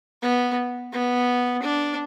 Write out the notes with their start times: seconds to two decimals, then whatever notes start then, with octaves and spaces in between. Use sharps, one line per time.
0.22 B3
0.93 B3
1.63 D4